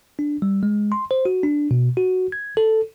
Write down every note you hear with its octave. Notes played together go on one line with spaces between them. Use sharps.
D4
G3
G#3
C6
C5
F#4
D4
B2
F#4
G#6
A4